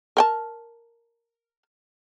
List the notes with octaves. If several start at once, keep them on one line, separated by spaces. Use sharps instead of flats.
A#4 G5 A5